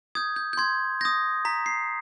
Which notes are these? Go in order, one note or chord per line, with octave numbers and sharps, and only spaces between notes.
D#6 G6 G#6
G6
G6
C6 G#6
D#6 G6 A#6
A#5 B6
C7